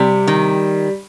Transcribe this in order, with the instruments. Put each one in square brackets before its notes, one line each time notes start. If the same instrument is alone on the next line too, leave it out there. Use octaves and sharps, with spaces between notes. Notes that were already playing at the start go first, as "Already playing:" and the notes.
Already playing: [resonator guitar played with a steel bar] C3 [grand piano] G3
[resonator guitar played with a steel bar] D#3